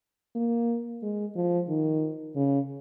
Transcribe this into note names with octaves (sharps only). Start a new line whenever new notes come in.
A#3
G#3
F3
D#3
C#3